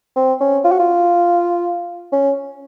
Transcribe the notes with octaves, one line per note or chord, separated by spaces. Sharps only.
C4
C#4
F4
F#4
F4
C#4